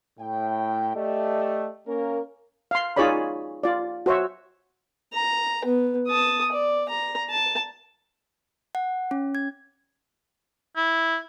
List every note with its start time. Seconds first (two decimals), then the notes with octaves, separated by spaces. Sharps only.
0.19 A2 G5
0.95 A3 G4 D5 D#5
1.88 A#3 C#4 A#4
2.71 F5 C6
2.96 D#4 F4 G#4 C#5 D5 B5
3.63 F4 D5
4.06 F#4 C5 C#5 E5
5.13 A#5
5.65 B3
6.07 A5 D#6
6.52 D5
6.88 A#5
7.30 A5
8.75 F#5
9.11 C#4
9.35 G#6
10.76 E4